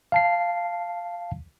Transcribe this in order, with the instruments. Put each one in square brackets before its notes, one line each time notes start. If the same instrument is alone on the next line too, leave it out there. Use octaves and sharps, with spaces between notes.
[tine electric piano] F5 A5 C7